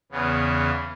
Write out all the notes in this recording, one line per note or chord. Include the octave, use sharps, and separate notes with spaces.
E2 C#3 B3